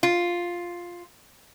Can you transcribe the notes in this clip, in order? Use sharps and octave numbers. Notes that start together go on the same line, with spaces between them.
F4